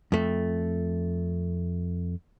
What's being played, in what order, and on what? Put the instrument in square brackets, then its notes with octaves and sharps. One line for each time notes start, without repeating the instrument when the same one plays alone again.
[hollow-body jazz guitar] F2 A3